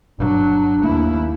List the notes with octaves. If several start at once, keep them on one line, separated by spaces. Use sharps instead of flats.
G1 F#3 D4
D#2 A3 A#3 E4